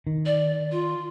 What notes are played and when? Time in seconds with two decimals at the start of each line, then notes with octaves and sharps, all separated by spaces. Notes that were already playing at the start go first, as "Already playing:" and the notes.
0.07 D#3
0.26 D5
0.72 F4